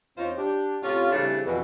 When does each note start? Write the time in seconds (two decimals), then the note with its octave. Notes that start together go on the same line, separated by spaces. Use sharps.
0.18 E2 C4 C#4 D#4 F4 C5
0.38 D4 G4
0.83 A2 C3 C#4 F4
1.12 C#3 E3 G3 A3 C4 D4
1.46 F2 B2 E3